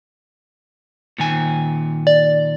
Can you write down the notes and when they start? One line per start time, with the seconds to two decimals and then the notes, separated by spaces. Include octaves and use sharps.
1.18 A#2 D#3 G#5
2.07 D5